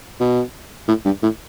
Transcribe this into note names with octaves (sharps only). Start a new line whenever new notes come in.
B2
A2
G2
A2